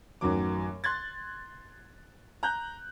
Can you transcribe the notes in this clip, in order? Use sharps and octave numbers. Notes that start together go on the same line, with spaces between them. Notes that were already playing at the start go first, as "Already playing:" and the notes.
A1 F#2 D#3 F#3 D6
C6 F#6 G#6 A6
A#5 F#6 G6